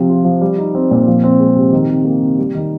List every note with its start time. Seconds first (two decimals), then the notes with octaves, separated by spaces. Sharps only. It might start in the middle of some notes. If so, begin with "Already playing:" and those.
Already playing: C3 F3 C4
0.09 F4
0.25 F3
0.41 G3
0.58 D#4
0.75 C4
0.91 A#2
1.07 F3
1.24 C4
1.40 G#3
1.56 C3
1.73 D#3
1.89 C3
2.05 A#3
2.22 C3
2.38 G3
2.55 D#3